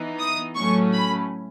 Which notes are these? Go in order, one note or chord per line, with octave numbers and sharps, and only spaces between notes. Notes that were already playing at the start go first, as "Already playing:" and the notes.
Already playing: E3 B3 D#4
D#6
A2 F#3 A3 C#4 C#6
B5